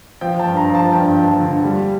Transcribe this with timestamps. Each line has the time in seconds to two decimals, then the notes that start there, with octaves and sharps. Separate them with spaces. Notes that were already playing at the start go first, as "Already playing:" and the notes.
0.21 F3 G5
0.40 A5
0.45 G2
0.57 A#5
0.69 F3
0.75 A5
0.92 G2 G5
1.16 F3
1.28 A5
1.40 D3
1.64 G3